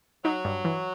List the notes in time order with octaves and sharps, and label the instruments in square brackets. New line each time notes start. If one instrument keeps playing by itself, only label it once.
[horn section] F#3 [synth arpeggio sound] D#4
[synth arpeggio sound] G2
E3